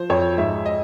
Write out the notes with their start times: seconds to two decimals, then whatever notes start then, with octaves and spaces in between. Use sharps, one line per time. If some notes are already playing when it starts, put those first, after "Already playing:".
Already playing: F3 C5
0.10 F2 C#5
0.38 G#2 E5
0.66 D#5